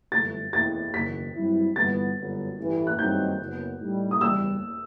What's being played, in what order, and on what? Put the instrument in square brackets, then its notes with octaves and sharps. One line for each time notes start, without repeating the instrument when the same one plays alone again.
[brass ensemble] G1 F#2 E3 A3 [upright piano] A6
[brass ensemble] E2 B2 A3 E4 [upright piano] A6
[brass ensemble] F#1 E2 D#3 [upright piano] B6
[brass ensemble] G2 F#3 C4 E4
[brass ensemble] G1 G2 E3 B3 [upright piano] A6
[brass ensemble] G1 F#2 F#3 B3
A1 G2 E3
[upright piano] F#6
[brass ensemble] G2 D#3 F#3 C4 D#4 [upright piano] G6
[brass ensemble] F#1 F#2 F#3 B3
A2 G3 D#4
[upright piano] D#6
[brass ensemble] F#1 E2 B2 G3 [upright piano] E6